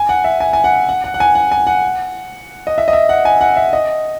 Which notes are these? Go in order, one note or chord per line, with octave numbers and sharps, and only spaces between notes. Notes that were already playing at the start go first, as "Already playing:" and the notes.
Already playing: G#5
F#5
E5
G#5
G#5
F#5
F#5
F#5
F#5
G#5
F#5
G#5
F#5
D#5
E5
D#5
E5
F#5
G#5
F#5
E5
D#5